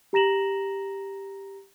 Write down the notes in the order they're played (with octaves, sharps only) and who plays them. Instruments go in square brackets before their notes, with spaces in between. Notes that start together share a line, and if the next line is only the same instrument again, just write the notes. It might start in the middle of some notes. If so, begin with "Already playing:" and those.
[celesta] G4 A#5 A#6 E7 F#7